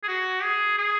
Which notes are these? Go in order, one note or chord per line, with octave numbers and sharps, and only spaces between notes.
G#4
F#4
G#4
G#4